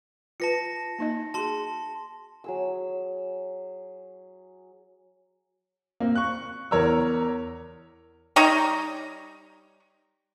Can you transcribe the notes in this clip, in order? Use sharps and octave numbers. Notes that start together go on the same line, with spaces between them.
F4 B4 A5 A#6 C#7
A#3 D#4 D#5
F#4 G#4 A5 C6
F#3 G#4 E6
A#3 C4
C#6 F#6
E2 A#4 C#5 A#5 E6
G3 D#4 C#5 A#5